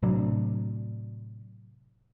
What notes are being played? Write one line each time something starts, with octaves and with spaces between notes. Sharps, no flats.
A2 C3 F#3 D4